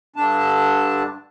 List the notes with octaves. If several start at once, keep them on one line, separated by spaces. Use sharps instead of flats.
G2 D3 D4 A5